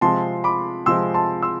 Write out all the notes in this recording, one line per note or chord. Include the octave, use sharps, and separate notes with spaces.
C3 F3 G#3 C4 A5 C6
B5 D6
C3 F3 G#3 C4 C6 E6
A5 C6
C6 E6